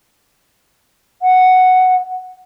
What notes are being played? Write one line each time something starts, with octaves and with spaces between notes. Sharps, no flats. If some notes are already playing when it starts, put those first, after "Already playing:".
F#5